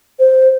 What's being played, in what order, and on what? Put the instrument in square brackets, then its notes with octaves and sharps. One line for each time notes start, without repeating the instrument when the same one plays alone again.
[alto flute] C5